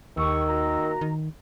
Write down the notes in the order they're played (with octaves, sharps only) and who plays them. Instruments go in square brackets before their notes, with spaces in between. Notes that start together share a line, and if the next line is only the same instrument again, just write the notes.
[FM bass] D#2 [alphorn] D#3 [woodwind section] G4 C#6 [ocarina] E6
[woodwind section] A#3 F#4 A#5
[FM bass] D#3